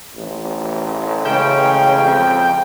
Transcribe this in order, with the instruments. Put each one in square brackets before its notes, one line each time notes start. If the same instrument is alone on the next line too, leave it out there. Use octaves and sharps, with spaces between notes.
[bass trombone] A1
[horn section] C#3 G#3 C#4 [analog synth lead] G5
[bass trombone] F2